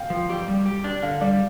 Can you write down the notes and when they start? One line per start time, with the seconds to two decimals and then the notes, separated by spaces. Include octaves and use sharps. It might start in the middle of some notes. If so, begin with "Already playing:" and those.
Already playing: F5 G5
0.10 F3
0.29 G4
0.48 G3
0.66 G4
0.84 D4
1.03 D3 F5
1.21 G3 D5